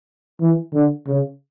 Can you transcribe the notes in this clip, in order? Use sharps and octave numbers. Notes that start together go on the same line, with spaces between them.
E3
D3
C#3